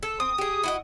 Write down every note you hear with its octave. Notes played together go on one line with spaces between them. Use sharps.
A4
C4 D#6
G4 G#4
E4 F#4 D#5